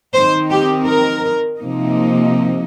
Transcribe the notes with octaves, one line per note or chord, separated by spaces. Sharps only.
D#3 C4 D#4 C5
G4
A#4
C3 F3 A#3 D#4